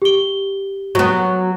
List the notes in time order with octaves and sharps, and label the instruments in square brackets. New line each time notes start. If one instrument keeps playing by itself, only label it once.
[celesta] G4 G7
[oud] F#3 B3